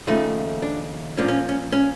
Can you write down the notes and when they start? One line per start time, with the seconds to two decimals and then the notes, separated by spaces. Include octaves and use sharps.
0.07 D#2 C#3 F3 A3 D#4
0.62 D4
1.17 A#2 F3 A#3 C#4 D4
1.28 C#4
1.49 C#4
1.72 C#4